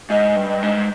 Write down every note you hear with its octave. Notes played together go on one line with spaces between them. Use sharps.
G#2 D#5
G2
D#5
G#2